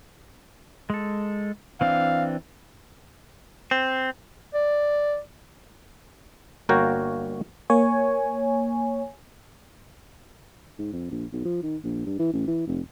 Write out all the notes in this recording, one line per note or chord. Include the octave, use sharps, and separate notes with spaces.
G#3 A4
E3 C4 D4 F5
C4
D5
G1 A#3 F#4 A#4 C#5 G5
A#3 C#5 G#5
G#2
F2
A#1
B1
F3
D#3
A#1
G2
E3
A1
E3
F1